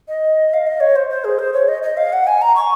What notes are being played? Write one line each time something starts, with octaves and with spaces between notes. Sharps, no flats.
D#5
F5
D#5
C#5
C5
C5
G#4
C5
C#5
D#5
D#5
F5
F#5
G#5
A#5
C#6